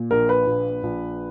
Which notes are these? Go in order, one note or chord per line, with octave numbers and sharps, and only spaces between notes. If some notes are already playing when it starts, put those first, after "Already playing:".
Already playing: A#2
A#1 A#4
B4
A#1
A#1